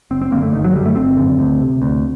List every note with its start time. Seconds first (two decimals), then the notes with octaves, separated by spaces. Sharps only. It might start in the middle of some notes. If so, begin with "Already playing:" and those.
0.11 F#1 C4
0.21 C4
0.31 F#2 D3 A#3
0.42 A3
0.53 G1 D#3
0.64 F#3
0.74 F#2 D3 G3
0.86 A3
0.96 G1 C4
1.17 F#2 D3
1.39 D2
1.60 C3
1.82 D2